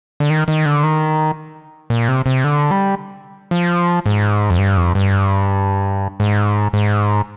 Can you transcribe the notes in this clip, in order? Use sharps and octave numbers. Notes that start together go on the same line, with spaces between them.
D3
D#3
D#3
D3
D#3
A#2
C3
C3
D3
G3
F3
G#2
F2
G2
F2
G2
G#2
G#2